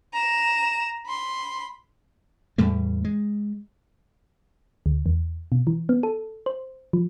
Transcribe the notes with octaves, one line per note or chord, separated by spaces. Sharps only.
A#5 E7
B5 C6
E2 A2 G3 A3
G#3
D2
E2
B2
E3
B3
A4
C5
F3